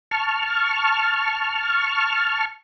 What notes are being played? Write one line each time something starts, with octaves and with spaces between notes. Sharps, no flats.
A5 C#6 F6